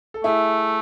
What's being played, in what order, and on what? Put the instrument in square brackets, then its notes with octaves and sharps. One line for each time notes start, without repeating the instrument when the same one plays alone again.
[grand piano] A4
[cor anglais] A3 [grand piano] E4 G#4